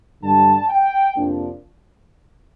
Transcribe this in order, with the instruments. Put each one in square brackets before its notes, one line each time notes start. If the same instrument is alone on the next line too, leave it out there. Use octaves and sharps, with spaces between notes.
[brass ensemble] G2 D3 G3 D4 A5
G5
F2 C3 F3 A#3 D4